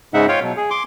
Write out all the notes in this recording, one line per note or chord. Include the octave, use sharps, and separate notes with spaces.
G#2 C#3 G#3 D#4 E5 F#5
F4 C#5 F5 G5
B2 F#3
G#4
C6 D6